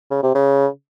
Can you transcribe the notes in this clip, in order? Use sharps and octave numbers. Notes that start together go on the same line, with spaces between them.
C#3
C3
C#3